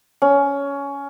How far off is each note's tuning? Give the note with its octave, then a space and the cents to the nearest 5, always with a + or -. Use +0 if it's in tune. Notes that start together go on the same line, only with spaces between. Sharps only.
C#4 +15